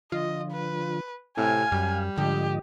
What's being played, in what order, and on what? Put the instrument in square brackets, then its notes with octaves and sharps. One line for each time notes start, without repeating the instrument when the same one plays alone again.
[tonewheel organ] D3 F3 [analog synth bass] F4 [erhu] D#5
[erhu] B4
[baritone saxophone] A2 [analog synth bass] C3 [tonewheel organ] F5 [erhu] G#5
[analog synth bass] F#2 [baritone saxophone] G3
[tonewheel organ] G#2 F3 D#5 [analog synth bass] D3 [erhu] G4